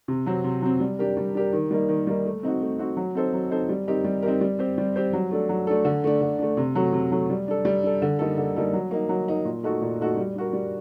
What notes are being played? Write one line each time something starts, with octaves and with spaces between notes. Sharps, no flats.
C3
F#3 C4
C3
F#3 C4
G3
D4 G4 A#4
G3
D4 G4 A#4
D#3
G3 A#3 D#4
D#3
G3 A#3 D#4
A3
C4 D#4 F#4
A3
C4 D#4 F#4
F#3
C4 D#4 A4 C5
F#3
C4 D#4 A4 C5
G3
C4 D#4 G4 A#4
G3
C4 D#4 G4 A#4
G3
C4 G4 C5
G3
C4 G4 C5
F#3
A3 D4 A4
F#3
A3 D4 A4
D3
A3 D4
D3
A3 D4
C3
F#3 A3
C3
F#3 A3
G3
D4 A4
G3
D4 A4
D3
G3 A#3 D#4 A4
D3
G3 A#3 D#4 A4
F#3
A#3 D#4
F#3
A#3 D#4
A#2
A3 D#4 F#4 A4
A#2
A3 D#4 F#4 A4
G3
D4 F#4 A#4
G3